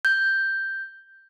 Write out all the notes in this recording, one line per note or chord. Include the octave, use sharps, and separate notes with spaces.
G6